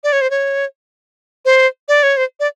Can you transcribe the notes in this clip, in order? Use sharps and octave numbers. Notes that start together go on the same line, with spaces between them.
D5
C#5
C5
C#5
C5
D5
C#5
C5
D5